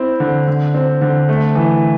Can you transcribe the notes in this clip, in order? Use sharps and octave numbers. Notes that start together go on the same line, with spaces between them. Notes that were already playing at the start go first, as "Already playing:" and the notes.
Already playing: C4 E4
D3
D3
C4
D3
A3
E3